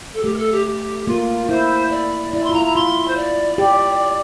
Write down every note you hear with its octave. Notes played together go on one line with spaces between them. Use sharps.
A4
A3 G4
A#4
A4
G4
G4
A#3 F4
E4 C5
D5
E4 D5
C6
F4
E4 A#5
A#5
F4 C6
C5
D5
G4